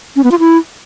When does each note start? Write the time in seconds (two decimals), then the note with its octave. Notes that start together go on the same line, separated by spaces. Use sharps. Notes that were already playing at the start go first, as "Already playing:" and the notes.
0.16 C#4
0.24 B3
0.32 F4
0.39 E4